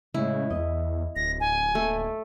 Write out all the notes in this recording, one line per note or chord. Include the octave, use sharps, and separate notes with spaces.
A2 C#3 G#3 E4
E2 D#5
D1 A#6
G#5
D#2 A3